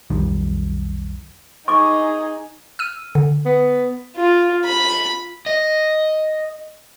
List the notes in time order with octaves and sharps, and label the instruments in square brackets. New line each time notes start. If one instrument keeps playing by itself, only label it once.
[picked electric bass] B1 F2 D#3 G3
[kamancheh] D#4 G#4 [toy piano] C#6 D6
[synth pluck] E6 F6 D#7
D3
[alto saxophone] B3
[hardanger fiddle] F4
B5
[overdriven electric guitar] D#5